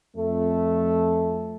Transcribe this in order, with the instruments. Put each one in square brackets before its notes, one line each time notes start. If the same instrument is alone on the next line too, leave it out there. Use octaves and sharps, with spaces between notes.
[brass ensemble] F2 A3